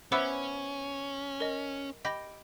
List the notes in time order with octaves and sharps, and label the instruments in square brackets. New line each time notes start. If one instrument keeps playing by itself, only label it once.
[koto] B3 E4 E5 [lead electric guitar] C#4 [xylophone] C5 D6 C#7
[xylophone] A#4 D#5
[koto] G4 [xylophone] D#5 B5 A#6